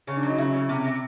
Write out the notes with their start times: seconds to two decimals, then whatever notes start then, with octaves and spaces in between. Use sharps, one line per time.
0.07 C#3 C#4
0.17 D4
0.23 F#3 D#4
0.38 C#3 E4
0.54 C#3
0.69 C3
0.85 C3